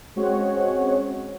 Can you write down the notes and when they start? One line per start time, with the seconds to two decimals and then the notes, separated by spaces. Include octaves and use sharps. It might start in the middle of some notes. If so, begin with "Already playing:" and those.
0.16 G#3 C4 C#4 F#4 C#5 F#5